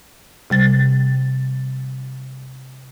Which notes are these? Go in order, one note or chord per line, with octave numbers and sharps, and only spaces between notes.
C3 G3 A6